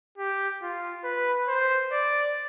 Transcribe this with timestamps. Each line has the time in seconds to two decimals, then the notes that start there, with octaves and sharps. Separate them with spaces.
0.18 G4
0.62 F4
1.04 B4
1.48 C5
1.92 D5